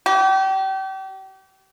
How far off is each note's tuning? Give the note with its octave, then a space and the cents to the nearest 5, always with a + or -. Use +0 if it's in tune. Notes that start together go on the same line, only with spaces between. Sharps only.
G4 -35